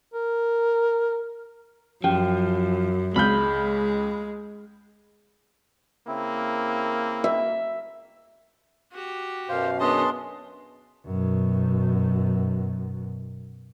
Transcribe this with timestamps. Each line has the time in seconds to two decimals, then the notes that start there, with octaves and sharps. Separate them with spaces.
0.14 A#4
2.04 F#2 F3 C#4 G4 G5
3.16 C#2 G#3 B5 F6 G6
6.07 C#3 A#3 C4 E4
7.24 E5
8.92 F#4 G4
9.49 F#2 B2 C5 F5
9.80 B3 C#4 D4 G#4 D#5 A5 C6
11.07 F#2 B2